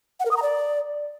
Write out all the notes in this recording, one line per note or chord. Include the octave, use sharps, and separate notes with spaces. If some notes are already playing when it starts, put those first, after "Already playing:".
F#5
A#4
D#6
A#5
D5